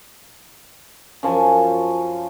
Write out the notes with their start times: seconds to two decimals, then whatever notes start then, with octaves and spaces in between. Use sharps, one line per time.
1.23 F#2 F3 G#5 A5